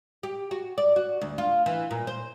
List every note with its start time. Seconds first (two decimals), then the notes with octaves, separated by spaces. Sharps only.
0.23 G4
0.51 F#4
0.78 D5
0.96 F#4
1.21 D2
1.38 F4
1.66 E3
1.91 A#2
2.07 C5